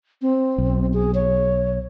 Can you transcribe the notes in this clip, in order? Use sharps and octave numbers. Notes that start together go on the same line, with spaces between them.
C4
B1
G#4
C#5